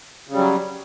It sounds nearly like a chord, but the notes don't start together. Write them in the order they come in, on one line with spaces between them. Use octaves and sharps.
C#3 G3 F#3